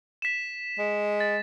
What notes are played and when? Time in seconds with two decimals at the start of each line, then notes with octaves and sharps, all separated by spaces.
0.22 B6 E7
0.79 G#3
1.20 A6